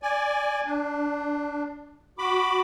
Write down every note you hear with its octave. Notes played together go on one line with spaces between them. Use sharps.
D5 G#5
D4
F#4 B5 D6